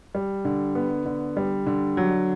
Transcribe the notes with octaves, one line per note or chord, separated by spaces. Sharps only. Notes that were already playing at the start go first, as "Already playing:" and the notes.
G3
D3
B3
D3
G3
D3
F#3